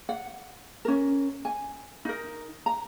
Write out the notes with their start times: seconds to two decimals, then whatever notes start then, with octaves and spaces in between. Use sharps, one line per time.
0.09 F#5
0.85 C#4 A#4
1.45 G#5
2.05 D#4 A#4
2.66 A#5